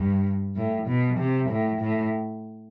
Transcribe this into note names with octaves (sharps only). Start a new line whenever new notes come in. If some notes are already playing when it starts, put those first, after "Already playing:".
Already playing: G2
A2
B2
C3
A2
A2